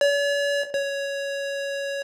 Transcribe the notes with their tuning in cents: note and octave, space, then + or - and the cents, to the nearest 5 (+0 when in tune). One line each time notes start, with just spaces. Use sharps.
C#5 +45
C#5 +10